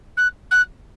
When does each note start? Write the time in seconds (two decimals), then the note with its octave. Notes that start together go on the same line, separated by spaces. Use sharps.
0.17 F#6
0.51 F#6